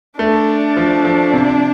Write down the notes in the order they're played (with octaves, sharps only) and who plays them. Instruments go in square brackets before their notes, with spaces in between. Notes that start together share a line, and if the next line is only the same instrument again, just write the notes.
[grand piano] A3 [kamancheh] D4
[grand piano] F3
F3
C3